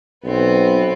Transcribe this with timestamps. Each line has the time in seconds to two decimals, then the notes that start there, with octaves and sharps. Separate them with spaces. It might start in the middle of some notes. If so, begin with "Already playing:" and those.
0.25 B1 B3 C4